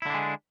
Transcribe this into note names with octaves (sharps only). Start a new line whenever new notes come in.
D3 G#3 D4 E4